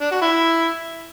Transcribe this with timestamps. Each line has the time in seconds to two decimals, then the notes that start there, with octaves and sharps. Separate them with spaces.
0.01 D4
0.12 F#4
0.22 E4